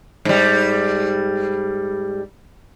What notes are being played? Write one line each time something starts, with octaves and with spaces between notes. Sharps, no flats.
G#2 G3